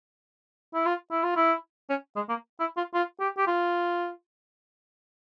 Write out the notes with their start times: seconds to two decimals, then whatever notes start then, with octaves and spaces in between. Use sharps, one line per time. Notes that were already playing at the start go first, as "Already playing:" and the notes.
0.74 E4
0.86 F4
1.10 E4
1.23 F4
1.36 E4
1.89 C#4
2.15 G#3
2.29 A#3
2.59 E4
2.77 F4
2.94 F4
3.20 G4
3.37 G4
3.47 F4